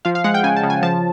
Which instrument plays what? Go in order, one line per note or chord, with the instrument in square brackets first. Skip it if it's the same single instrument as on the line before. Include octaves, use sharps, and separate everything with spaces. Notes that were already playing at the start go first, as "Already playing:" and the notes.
[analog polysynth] F3 F5
F5
G#3 F#5
G5
C#3 G#5
A5
C#3
G#5
F3 A5